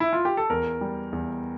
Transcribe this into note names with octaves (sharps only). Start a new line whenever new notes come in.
E4
F4
G4
A4
E2 A#4
G3
E2